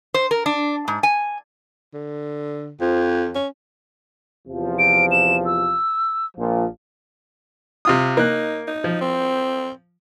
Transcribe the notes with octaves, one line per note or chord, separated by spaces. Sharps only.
C5
A#4
D4
G#2
G#5
D3
F2 F3
C#4
E2 C3 F3
D7
E7
E6
A#1 A#2 F3
C3 F4 D#6
A#3 D#4 F#6
D#4
F3
C4